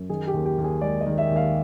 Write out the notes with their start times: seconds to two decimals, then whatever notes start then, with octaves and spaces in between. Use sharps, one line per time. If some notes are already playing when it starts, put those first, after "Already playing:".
Already playing: F#2
0.09 D#3 G#4
0.27 G4
0.34 D#2
0.45 G4
0.58 D#2
0.64 G#4
0.81 G#3 D5
1.01 D#5
1.07 D#3
1.18 E5
1.31 D#2
1.36 F5